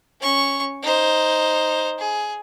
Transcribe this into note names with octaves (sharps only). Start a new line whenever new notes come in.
C#4 C#6
D#4 C5
G#4